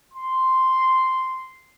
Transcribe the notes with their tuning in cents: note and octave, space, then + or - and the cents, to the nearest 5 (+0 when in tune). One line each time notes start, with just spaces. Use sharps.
C6 -5